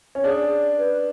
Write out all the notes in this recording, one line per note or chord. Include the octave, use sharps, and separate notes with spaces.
C#4
D4 G#4
B4